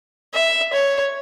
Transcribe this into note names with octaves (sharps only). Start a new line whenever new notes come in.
E5
C#5